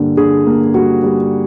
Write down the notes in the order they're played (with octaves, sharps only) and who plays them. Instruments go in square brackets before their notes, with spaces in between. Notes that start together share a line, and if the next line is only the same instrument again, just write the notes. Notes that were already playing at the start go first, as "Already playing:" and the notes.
Already playing: [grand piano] G2 D3 G3 A#3
D3 G#4
A#3
G3 F#4
G3